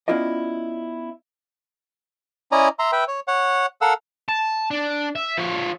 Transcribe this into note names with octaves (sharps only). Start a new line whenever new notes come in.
B3 C#4 E4 F4 D5 D#5
C#4 E4 D5 D#5 G#5 A#5
E5 A#5 C6
B4 E5 G5
C#5
C#5 F#5
A4 A#4 F5 F#5 E6
A5
D4
E5
F3 C#5